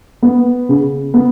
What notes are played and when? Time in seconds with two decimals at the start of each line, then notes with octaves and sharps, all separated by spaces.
0.22 B3
0.69 C#3
1.14 B3